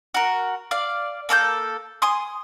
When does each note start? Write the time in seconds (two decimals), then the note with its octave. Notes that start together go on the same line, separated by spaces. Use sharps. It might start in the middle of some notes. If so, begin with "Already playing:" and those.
0.14 F#4 A#4
0.71 D5 F5
1.29 A#3 A4 A5 G6
2.02 G#5 C6 D#6